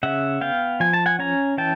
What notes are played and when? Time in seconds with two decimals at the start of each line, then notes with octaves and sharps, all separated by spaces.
0.03 C#3 E5 F#5
0.41 B3 F5 G5
0.80 F3 G#5
0.93 A5
1.06 F#5 G#5
1.19 C#4 G#5 A#5
1.58 E3 G5 A5